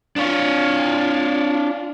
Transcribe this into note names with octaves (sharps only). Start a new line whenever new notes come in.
D4 F4 C#5